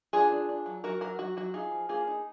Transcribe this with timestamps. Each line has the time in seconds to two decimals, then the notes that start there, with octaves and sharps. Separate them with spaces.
0.13 D4 F4 G#4
0.32 D4
0.49 D4
0.66 F#3
0.84 F#3 F#4 A#4
1.01 F#3 F#4 A#4
1.19 F#3 F#4
1.37 F#3 F#4
1.54 D#4 F4 G#4
1.71 F3
1.89 A#3 F4 G#4
2.07 D#4